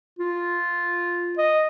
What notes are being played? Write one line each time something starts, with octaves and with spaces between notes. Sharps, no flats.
F4
D#5